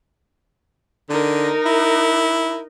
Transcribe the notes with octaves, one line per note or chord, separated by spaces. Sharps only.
D3 D#4 A#4
E4